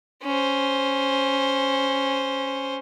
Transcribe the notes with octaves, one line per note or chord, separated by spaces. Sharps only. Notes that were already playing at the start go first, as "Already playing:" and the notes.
C#4 C5